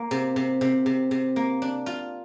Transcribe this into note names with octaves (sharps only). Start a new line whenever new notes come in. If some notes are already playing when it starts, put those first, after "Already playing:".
Already playing: A#3
C3
C3
C3
C3
C3
A#3
D4
F4